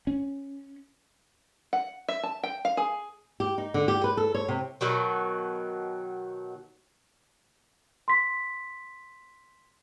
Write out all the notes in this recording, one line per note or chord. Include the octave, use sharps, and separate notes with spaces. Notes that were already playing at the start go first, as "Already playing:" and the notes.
C#4
F#5
E5
A5
G5
F5
G#4
G4
D#4
D3
G4
B4
A4
C#5
C3
B2 D#3 F#3
C6 B6